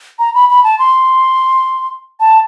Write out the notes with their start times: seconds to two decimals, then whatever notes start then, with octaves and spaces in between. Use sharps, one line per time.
0.19 A#5
0.34 B5
0.49 B5
0.64 A5
0.79 C6
2.20 A5